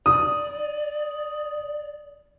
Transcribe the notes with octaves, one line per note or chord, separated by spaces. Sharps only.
D5 D#6